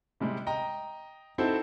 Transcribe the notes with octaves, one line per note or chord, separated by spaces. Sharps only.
C3 G3 G#3
D#5 G5 A#5
C4 D#4 E4 F#4 A4 C5